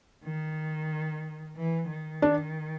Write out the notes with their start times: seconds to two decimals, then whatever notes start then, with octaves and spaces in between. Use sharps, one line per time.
0.25 D#3
1.56 E3
1.90 D#3
2.22 D4